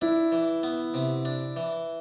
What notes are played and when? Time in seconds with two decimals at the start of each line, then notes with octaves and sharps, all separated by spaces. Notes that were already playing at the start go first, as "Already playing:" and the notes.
0.01 D4 E4
0.32 E3
0.63 B3
0.94 C3
1.25 D4
1.56 E3